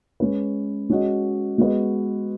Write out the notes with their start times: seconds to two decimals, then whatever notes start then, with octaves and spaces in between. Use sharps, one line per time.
0.20 G#3 C#4 B4
0.89 G#3 C#4 F#4 D#5
1.58 G#3 B3 F#4 B4 D#5